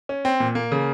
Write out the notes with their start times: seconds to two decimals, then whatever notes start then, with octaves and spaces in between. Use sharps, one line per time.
0.09 C#4
0.25 C4
0.40 A#2
0.55 A#3
0.72 C#3